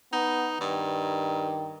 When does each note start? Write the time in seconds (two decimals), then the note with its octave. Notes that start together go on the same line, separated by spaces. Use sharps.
0.12 B3 D#4
0.61 G2 D#3